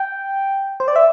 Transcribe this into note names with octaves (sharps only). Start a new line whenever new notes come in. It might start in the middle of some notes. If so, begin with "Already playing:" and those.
Already playing: G5
C5
D5
E5